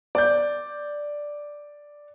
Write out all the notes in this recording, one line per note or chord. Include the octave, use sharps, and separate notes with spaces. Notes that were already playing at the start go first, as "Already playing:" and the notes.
D5 G6